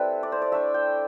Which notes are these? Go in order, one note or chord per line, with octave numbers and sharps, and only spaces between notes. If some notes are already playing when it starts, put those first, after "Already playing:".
Already playing: G3 C4 E4 A4 B4
D5
C5
D5
A3 D4 E5
G5